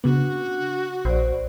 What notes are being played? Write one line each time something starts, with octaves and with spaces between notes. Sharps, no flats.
C#3 B3 D4 F#4
A#1 C5 D5